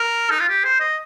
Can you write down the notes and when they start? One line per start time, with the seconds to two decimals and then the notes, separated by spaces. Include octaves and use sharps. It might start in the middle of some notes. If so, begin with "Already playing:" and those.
Already playing: A#4
0.30 D#4
0.40 F4
0.49 G4
0.65 C5
0.80 D#5